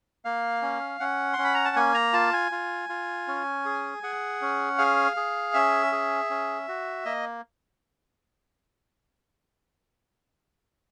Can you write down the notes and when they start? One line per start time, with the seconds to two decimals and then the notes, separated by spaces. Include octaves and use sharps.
0.25 A#3 F5
0.62 C#4
1.00 C#4 F#5
1.33 C6
1.38 C#4
1.44 B5
1.54 A#5
1.65 A5
1.76 A#3 G#5
1.94 A#5
2.13 F4 A5
2.33 G#5
2.52 F4
2.89 F4
3.28 C#4
3.65 G#4
4.03 G#4 F#5
4.41 C#4
4.78 G#4 F5
5.17 G#4
5.54 C#4 E5
5.92 G#4
6.30 C#4
6.68 F#4
7.05 A#3 D#5